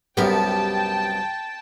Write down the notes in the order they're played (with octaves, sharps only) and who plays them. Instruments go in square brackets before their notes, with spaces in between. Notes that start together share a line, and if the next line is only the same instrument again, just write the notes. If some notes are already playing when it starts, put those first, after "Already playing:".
[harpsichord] C2 F#2 B3 [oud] G4 A#4 [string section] G5 A5